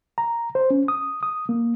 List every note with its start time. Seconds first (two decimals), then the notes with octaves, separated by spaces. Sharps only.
0.18 A#5
0.55 C5
0.71 C#4
0.88 D#6
1.23 D#6
1.49 A#3